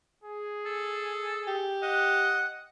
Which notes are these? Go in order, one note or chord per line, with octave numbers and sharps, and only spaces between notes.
G#4
A4
G4
D#5 F#5